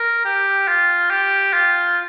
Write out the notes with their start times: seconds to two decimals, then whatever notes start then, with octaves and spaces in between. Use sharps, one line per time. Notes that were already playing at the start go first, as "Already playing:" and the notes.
Already playing: A#4
0.25 G4
0.68 F4
1.10 G4
1.53 F4